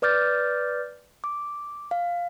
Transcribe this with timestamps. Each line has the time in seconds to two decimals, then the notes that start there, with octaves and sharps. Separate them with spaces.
0.02 B4 D5 D6 F6 G6 A6
1.24 D6
1.91 F5